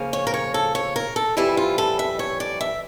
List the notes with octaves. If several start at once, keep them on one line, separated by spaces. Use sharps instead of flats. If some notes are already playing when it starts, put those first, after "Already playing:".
Already playing: C#3 F3 A#3 C#4
C#5
A#4
C#5
A4
C#5
A#4
A4
F2 E3 G3 E4
F4
A4
E5
C#5
D5
E5